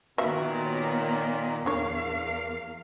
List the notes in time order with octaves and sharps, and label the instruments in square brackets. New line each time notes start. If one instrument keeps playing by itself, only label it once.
[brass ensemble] A#2 [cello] D#3 B3 [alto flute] F#4 [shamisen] E5 F5
[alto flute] C#5
[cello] E2 F5 [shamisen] D4 C#5 [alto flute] A#4